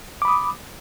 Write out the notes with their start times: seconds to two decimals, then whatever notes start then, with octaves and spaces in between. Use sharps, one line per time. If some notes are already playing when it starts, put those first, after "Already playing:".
0.22 D6
0.25 B5
0.28 D#6